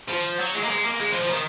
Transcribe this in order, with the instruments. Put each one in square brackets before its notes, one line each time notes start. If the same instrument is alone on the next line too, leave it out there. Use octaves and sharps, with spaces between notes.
[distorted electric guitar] F3
F#3
G#3
A#3
G#3
A#3
G#3
F3
F3
D#3